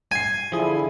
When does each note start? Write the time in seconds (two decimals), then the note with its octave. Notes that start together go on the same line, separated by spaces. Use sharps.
0.12 G#5 C7 D#7
0.52 D3 F3 E4 G#4